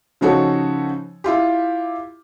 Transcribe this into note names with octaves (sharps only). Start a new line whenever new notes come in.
C#3 F3 D#4 F#4 A4 C#5
E4 F4 G4